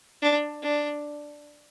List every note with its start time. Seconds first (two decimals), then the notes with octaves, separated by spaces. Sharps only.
0.22 D4
0.63 D4